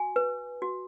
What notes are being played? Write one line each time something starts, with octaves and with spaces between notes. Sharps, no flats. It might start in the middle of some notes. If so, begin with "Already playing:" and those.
Already playing: F#4 G#5
B4
F#4